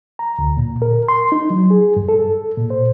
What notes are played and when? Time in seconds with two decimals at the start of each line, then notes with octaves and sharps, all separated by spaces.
0.19 A#5
0.39 D2
0.57 A#2
0.82 A#4
1.08 C6
1.32 D#4
1.50 F#3
1.70 G#4
1.96 G2
2.09 A4
2.58 A#2
2.70 C5